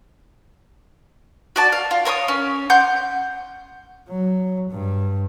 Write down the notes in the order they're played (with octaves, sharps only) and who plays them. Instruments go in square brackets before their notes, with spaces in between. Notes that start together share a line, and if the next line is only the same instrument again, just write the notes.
[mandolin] F#4 D5 A5
F5
F4
A#4 C#5 C6 D#6
C#4
F#5 C6 D6 G6
[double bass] F#3
G2